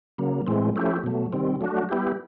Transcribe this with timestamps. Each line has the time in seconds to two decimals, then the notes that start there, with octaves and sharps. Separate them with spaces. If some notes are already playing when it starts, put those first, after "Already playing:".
0.18 C#3 F#3 A#3
0.47 A2 E3 G#3 C4
0.76 F3 A3 C#4 E4 G4
1.03 B2 F#3 A3
1.33 C3 D#3 G3 C4
1.61 F#3 A3 D4 F#4
1.89 G3 B3 E4 G4